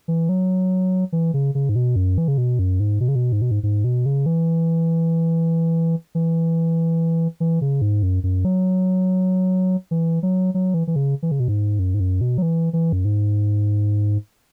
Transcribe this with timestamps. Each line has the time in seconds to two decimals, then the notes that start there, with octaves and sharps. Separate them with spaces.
0.08 E3
0.29 F#3
1.12 E3
1.34 C#3
1.55 C#3
1.69 G#2
1.76 B2
1.96 F#2
2.18 E3
2.28 C#3
2.38 B2
2.59 F#2
2.80 G#2
3.00 B2
3.08 C#3
3.15 B2
3.32 G#2
3.42 B2
3.51 G#2
3.63 G#2
3.84 B2
4.06 C#3
4.26 E3
6.15 E3
7.40 E3
7.61 C#3
7.82 G#2
8.03 F#2
8.23 F#2
8.45 F#3
9.91 E3
10.23 F#3
10.54 F#3
10.74 E3
10.87 E3
10.96 C#3
11.23 E3
11.31 C#3
11.40 B2
11.48 G#2
11.79 F#2
11.94 G#2
12.00 F#2
12.21 B2
12.38 F#3
12.42 E3
12.73 E3
12.93 F#2
13.05 G#2